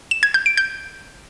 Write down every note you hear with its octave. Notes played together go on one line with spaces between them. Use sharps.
E7
G#6
G6
D7
G6